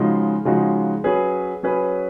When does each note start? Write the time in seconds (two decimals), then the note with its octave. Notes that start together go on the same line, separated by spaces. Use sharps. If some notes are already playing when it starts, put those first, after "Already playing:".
Already playing: C#3 F3 G#3 D#4 F#4
0.45 C#3 F3 G#3 D#4 F#4
1.04 F#3 C#4 G#4 B4
1.63 F#3 C#4 G#4 B4